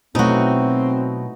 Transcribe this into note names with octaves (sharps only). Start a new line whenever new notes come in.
B2 F#3 A3 C4 D#4 E4 F#4